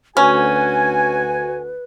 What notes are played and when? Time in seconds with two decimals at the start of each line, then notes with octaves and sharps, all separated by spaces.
0.17 D2 C#4 F#4 B4 G#5